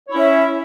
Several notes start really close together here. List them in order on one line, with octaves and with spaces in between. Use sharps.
C#5 E4 C#4 E5